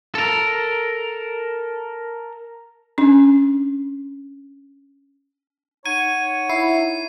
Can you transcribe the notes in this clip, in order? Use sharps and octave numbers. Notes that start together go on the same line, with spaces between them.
A4 A#4
C#4 D4
D#4 C#5 F#5 G#6 D#7
E4 C7